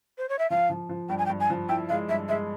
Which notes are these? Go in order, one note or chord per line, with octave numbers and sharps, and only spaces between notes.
C5
C#5
E5
F3 F5
F3
F3
G2 G5
G#5
G5
G2
G#5
F3
E4 G5
G#3 F5
G2 E5
G#3 E5